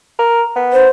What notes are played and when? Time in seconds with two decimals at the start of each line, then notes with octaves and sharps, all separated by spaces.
0.19 A#4
0.56 B3
0.73 C5